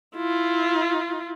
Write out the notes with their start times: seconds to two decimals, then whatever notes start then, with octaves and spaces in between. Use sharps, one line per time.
0.16 E4 F4